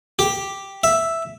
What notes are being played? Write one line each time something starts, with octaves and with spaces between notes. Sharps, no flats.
G4
E5